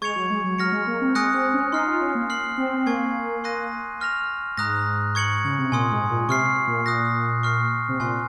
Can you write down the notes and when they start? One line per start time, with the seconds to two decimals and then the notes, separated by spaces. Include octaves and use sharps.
0.01 G#3 C#6 G#6 C#7 F7
0.16 F#3
0.30 G#3
0.44 F#3
0.58 F#3 F6 A#6 C#7
0.72 G#3
0.87 A#3
1.01 C4
1.15 G#3 G#5 D#6 F#6 A#6 C#7
1.34 C4
1.54 C#4
1.72 D#4 C6 F6 C7
1.86 F4
2.01 C#4
2.15 A#3
2.30 F6 C7 F#7
2.58 C4
2.78 C4
2.86 A#3 G#5 C#6 G#6 C7
3.44 C6 D#6 F#6 A#6 D#7
4.00 C#6 F6 A#6 F7
4.57 G#2 A#5 D#6 F#6 A#6
5.15 C#6 G#6 C#7 F#7
5.44 C#3
5.58 C3
5.72 A#2 G#5 C6 D#6
5.91 G#2
6.10 A#2
6.28 C3 C#6 F6 C7
6.67 A#2
6.86 A#2 D#6 F#6 A#6
7.43 C#6 F6 C7
7.89 C3
8.00 A#2 G#5 C6 F#6